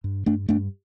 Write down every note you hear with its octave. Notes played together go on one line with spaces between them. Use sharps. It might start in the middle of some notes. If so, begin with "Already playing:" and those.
G2
G2 A3 D4
G2 A3 D4